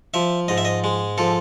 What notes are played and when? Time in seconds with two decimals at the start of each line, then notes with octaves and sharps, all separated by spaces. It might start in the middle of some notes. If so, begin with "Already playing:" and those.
0.14 F3 E5
0.48 G#2 D#5
0.58 E5
0.65 D#5
0.84 G#3
1.18 F3 A4